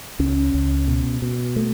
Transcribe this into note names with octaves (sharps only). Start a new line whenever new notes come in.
C#2 C#4
C#2
B2
B2
A3